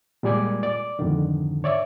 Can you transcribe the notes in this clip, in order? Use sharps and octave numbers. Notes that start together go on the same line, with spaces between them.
A#2 G3 G#3 D5 G#5 D6
D5 D6
F2 G#2 D3 D#3
C#5 D5 E5